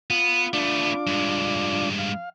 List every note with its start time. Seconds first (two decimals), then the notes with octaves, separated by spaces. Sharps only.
0.10 B3 F4
0.53 A3 B3 D4 F4 D6
1.07 G2 G#3
1.98 F5